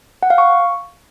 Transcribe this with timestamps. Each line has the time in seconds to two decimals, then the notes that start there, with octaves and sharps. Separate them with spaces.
0.23 F#5
0.30 F5
0.38 C#6